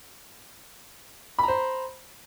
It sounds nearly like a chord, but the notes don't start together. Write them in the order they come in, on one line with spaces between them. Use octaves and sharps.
B5 A#5 C5